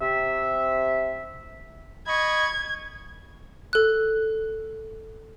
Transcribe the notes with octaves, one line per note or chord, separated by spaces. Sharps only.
C3 E5
D#5 B5 C#6 G#6
A4 F#6